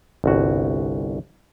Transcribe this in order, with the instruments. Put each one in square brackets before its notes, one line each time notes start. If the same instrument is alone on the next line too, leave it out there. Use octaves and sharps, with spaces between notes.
[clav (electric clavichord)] G1 C2 F#4